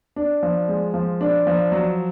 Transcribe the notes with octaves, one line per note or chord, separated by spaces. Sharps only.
D4
F3
G#3
F3
D4
F3
F#3